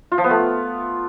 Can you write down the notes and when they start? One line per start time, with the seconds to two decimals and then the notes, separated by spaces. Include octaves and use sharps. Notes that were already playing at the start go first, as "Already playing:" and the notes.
0.12 F4
0.18 F3
0.24 B3
0.30 A3